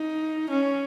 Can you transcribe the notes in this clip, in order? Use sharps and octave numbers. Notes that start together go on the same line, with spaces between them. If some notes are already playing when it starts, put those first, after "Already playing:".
Already playing: D#4
C#4